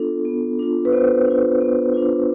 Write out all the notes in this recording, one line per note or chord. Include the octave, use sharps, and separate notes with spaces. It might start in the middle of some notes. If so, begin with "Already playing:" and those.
Already playing: B3 D4 F4 A4
B3
D4 F4
B4
B3 C5
D4 F4
B3
D4 F4